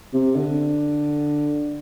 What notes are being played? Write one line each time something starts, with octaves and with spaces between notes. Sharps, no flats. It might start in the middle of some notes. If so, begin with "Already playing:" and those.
C3
D3